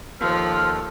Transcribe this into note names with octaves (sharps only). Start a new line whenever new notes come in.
D#2 F3 A4 F6